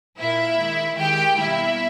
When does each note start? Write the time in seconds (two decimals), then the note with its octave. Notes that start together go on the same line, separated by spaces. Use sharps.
0.18 A#2 A#3 E4 E5
0.58 D#3 G#3
0.97 D#3 G#3 G4 G5
1.37 B2 G3 A#3 E4 E5